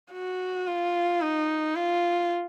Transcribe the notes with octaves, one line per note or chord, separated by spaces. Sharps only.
F#4
F4
D#4
F4